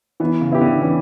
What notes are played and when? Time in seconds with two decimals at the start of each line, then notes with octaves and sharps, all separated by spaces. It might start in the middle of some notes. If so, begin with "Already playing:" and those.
0.20 E3 B3
0.41 C#3
0.51 B3 E4 G4
0.61 D3
0.81 E3 C#4